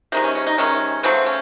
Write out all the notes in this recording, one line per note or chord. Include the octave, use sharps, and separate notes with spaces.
C3 D#3 G#3 D#4
C#4
C#4
D#4
C3 D#3 G#3 C#4
C#3 F#3 A3 C4
C#4